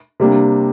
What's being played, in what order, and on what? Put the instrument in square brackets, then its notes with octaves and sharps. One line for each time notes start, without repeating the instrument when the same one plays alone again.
[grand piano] C3 G3 A#3 D4